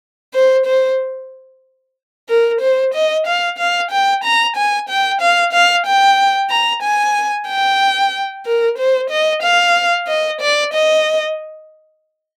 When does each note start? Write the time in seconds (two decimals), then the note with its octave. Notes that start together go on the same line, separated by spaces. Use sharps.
0.34 C5
0.66 C5
2.29 A#4
2.61 C5
2.94 D#5
3.27 F5
3.58 F5
3.91 G5
4.24 A#5
4.56 G#5
4.89 G5
5.21 F5
5.53 F5
5.86 G5
6.50 A#5
6.83 G#5
7.48 G5
8.46 A#4
8.78 C5
9.10 D#5
9.43 F5
10.08 D#5
10.41 D5
10.73 D#5